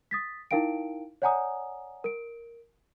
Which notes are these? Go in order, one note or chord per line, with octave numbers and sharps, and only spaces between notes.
D#6 A6 B6
D#4 E4 A#4 F5 G5 D7
C#5 D5 F#5 G#5 A#5 D#6
A#4 D7